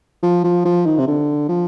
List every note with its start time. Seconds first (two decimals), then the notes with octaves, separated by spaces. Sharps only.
0.23 F3
0.44 F3
0.65 F3
0.86 D#3
0.98 C3
1.07 D3
1.49 F3